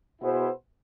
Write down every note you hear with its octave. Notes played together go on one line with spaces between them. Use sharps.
B2 B3 E4 G#4 C5